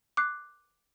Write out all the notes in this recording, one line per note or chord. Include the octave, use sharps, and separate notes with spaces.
D6 F#6 C7